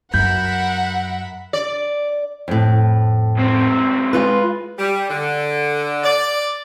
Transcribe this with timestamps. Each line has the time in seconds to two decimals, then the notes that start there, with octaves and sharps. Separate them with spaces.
0.14 F#2 A#4 E5 F#5 B5 G6
1.53 D5
2.48 F2 A2
3.37 C#2 C4
4.13 G#3 F4 B4
4.78 G3
5.09 D3
6.04 D5